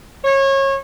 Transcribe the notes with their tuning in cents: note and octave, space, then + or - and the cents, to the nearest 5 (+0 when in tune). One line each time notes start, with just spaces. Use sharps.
C#5 -25